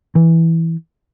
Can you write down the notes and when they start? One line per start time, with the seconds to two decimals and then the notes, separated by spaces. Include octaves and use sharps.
0.15 E3